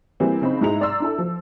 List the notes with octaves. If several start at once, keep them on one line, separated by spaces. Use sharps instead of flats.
E3 G3 A#3 C4
C#3 C4 D#4 B5
G#2 G#3 E4 A#5 F7
D5 A#5 C6 E6
D4 E4 A4
F3